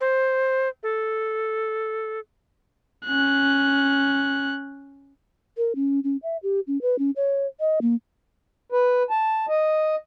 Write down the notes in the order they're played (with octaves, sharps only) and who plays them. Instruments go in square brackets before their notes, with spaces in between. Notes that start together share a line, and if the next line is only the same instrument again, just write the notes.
[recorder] C5
A4
[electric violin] C#4 F#6
[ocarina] A#4
C#4
C#4
E5
G4
C#4
B4
C#4
C#5
D#5
A#3
[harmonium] B4
A5
D#5